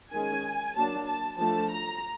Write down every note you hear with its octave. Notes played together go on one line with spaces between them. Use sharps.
D#3 G#3 C#4 G#5
F#3 A#3 D4 A5
A5
F3 A3 D4 A5
A#5